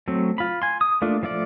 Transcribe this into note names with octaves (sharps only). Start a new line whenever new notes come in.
F#3 A3 C4
F4 B5
G#5 C6
D#6
A3 A#3 D4 F4
F3 A3 F4 D5